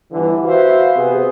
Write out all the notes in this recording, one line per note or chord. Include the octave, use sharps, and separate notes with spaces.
G1 D3 E3
F#4 B4 C5 E5 F5
C3 B3 G#4